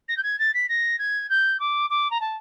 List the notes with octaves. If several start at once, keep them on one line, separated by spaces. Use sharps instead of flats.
A#6
G6
G#6
A6
B6
A#6
G#6
G6
D6
D6
A#5
A5